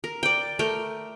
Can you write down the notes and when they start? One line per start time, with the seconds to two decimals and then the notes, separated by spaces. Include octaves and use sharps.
0.04 A#4
0.23 D5 G5
0.59 A3 A#4 G5